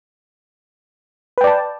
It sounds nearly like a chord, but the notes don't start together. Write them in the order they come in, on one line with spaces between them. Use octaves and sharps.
B4 G5 D5 A5